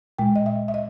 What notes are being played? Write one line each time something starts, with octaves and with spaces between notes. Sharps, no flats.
A#2 G#3 G5
D#5
E5
E5
D#5